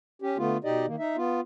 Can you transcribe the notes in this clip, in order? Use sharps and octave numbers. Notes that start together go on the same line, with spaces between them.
C#4 G4
D3 A3 B3 F4
B2 D#4 G4 D5 D#5
D#3 A#3
D#4 E5
B3 F4